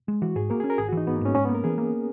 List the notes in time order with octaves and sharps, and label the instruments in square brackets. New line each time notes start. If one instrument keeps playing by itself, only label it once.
[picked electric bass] G#3
[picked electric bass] E3 [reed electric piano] F#4
[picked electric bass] G#2 [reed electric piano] G#4
[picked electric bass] A#3 [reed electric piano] A#4
[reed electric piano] G#4
[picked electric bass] C#4
[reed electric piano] A#4
[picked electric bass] G#1 [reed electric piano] G#4
[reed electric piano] F#4
[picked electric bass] E3
[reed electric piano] D#4
[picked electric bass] G#1 [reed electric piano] B3
[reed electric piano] A#3
[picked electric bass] G#2 [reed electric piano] C#4
[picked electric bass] G#2 [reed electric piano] C#4
[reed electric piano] B3
[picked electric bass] A#3
[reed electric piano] A#4
[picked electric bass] E3 [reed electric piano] G#4
[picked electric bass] A#3